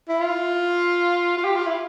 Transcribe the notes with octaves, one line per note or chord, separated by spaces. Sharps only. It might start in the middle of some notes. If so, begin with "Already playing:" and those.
E4
F4
F4
G4
F4
E4